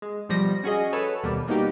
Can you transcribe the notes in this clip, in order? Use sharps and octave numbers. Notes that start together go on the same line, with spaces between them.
G#3
B2 F3 G3 A#6
C#4 F#4 G#4 D#5
A4 B4 C#5 A5
D#2 B2 G3 A#3
G3 A#3 B3 D#4 F#4 G4